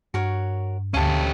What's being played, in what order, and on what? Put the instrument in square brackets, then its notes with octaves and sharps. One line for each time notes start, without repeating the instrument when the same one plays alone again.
[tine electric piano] G2 [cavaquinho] F#4 A#4 C#5
[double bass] D2 [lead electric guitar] C#4 G4 [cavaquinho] F5 A5 C#6